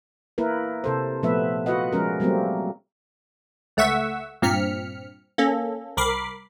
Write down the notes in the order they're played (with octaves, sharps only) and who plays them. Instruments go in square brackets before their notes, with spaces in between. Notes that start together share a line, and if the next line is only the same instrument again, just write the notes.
[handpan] A#3 E4 A#4 B4
C3 A4 C5
A#2 F3 A3 B3 B4 E5
F4 F#4 B4 D#5 F#5
F3 G#3 C#4 A#4
F#3 G3 A3 A#3 C4
[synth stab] C#2 A3 E5 F#5 C#6 E6
G2 A#2 C4 F6 B6 C#7
A#3 C#4 A4
C2 A#4 B5 D6 C7